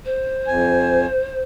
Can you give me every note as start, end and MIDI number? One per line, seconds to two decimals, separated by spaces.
0.05 1.41 72
0.47 1.06 41
0.47 1.06 80